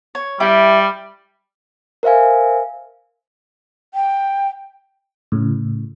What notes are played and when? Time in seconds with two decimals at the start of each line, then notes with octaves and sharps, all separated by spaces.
0.15 C#5
0.40 G3 E4 G4
2.03 A#4 C5 E5 F5 G#5
3.94 G5
5.32 A2 C#3